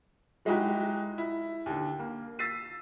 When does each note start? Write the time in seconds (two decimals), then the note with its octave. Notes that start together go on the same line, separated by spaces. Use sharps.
0.45 F#3 G#3 D#4 E4 F#4 G4
1.18 E4
1.66 D#2 D3
1.99 A#3
2.39 E6 A6 B6 C7 D#7